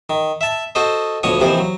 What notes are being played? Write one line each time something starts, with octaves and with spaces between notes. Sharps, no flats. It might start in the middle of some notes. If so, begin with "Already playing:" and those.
D#3
E5 A5
F#4 A4 C5 D#5
D2 B2 F3 C#5 C#6 D#6
D#2 C3 E3 F3 C5
F#3